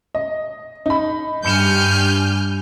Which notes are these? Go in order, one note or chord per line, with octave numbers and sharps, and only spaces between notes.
D#5
D#4 B5
G2 G3 G#5 B5 F6 G6 C#7 E7